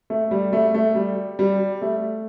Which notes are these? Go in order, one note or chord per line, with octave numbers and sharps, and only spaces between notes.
A3
G3
A3
A3
G3
G3
A3